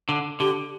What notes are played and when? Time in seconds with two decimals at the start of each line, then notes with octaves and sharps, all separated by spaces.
0.09 D3
0.40 D3 G4